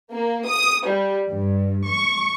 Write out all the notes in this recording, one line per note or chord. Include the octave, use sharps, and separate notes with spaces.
A#3
D#6
G3
G2
C#6